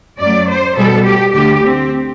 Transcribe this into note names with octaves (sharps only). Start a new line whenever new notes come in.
F#2 F#3 A3 D5
C5
B2 G3 B3 A4
G4
D2 D3 A3 G4
C4